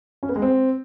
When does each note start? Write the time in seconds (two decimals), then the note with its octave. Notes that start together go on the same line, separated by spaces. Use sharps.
0.23 C#4
0.29 B3
0.36 G#3
0.42 C4